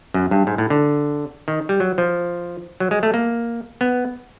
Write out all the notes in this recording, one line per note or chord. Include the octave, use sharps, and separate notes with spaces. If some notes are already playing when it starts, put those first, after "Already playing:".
F#2
G2
G#2
A2
D3
D#3
G3
F#3
F3
F#3
G#3
A3
A#3
B3